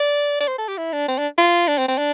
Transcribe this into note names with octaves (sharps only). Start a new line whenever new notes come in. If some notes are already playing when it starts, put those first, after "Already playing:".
Already playing: D5
D5
C5
A4
G4
E4
D4
C4
D4
F4
D4
C4
C4
D4